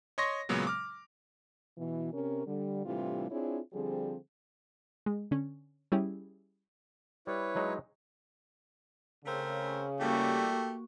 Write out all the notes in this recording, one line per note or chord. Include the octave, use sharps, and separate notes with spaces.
C#5 D#5 C6 C#6 A#6
A#2 C#3 F#3 G#3 B3
D6 F6
B2 E3
C3 C#4 A#4
D3 G3
A2 C3 E3 G3 D4 F4
C4 D4 E4 F4 G#4 C#5
D3 F3 G3 C4 G#4
G#3
D3 C#4
G3 C#4 E4 G4 G#4
G3 E4 B4 C#5
F#3 G#3 D#4
C#3 A3 C4 A#4
E3 G3 A3 A#3 F#4 G4